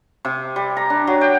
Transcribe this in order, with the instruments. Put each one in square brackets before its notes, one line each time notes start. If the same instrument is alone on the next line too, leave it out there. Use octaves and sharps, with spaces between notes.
[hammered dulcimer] C3
G3
A#5
D4
F#3
G5